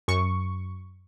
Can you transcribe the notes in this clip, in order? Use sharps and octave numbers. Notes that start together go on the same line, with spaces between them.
F#2 C#6